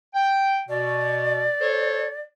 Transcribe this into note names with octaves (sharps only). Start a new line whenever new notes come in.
G5
B2 D5
A4 C5 C#5